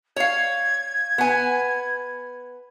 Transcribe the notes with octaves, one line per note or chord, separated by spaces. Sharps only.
C#5 F5 G#6
B3 G#5